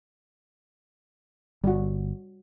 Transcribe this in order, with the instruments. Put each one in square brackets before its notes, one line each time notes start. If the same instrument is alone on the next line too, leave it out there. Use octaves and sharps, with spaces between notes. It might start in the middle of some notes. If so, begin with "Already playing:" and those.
[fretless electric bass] G1 [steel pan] G3 F#4